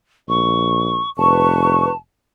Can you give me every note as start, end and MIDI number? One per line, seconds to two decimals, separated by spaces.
0.29 0.99 34
0.29 1.10 85
1.18 1.89 29
1.18 1.89 71
1.18 1.96 81
1.18 1.89 85